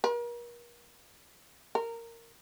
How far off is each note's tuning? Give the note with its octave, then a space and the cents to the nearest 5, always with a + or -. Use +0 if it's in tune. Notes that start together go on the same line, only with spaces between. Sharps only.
A#4 +40
A#4 -15